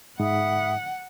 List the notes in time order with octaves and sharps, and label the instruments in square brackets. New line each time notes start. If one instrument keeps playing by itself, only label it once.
[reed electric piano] G#2 [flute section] E5 B5 D#6 [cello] F#5